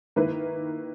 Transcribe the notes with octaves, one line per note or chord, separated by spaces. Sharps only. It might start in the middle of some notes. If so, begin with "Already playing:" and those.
D#3 A#3 E4 B4